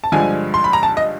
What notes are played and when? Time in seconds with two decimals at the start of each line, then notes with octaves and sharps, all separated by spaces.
0.04 A5
0.12 G2 D3 F3 G#3 G#5
0.54 C6
0.64 B5
0.73 A#5
0.83 A5
0.97 D#5